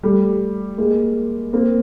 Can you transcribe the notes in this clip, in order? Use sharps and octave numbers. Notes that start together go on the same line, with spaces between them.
G3 A3
G#3 A#3
A#3 C4